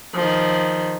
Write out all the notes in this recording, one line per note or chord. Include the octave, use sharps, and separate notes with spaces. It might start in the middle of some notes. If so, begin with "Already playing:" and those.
D#3 F3